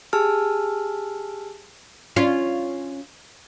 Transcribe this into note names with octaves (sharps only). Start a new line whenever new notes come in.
G4 G#4 G#5 A5 E6 F6
C#4 F4